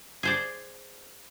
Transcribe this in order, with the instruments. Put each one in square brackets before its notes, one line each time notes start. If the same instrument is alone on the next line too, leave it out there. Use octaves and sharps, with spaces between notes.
[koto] G#4 C5 D5